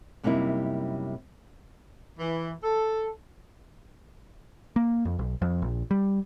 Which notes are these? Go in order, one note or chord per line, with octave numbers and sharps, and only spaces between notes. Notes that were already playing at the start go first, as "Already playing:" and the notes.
F#2 C3 G3 A#3 D#4 E4
E3
A4
A#3
F2
B1
F2
A#1
G3